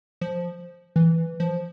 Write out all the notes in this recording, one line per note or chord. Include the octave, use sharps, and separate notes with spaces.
F3
E3
F3